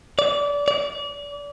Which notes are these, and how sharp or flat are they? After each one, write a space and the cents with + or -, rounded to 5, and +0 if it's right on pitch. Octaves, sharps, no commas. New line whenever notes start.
D5 -25
D5 -30